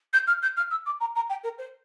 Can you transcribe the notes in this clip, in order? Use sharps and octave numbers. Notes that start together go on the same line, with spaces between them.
G6
F6
G6
F6
E6
D6
A#5
A#5
G5
A#4
C5